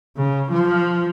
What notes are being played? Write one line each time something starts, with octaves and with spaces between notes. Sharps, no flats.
C#3
F3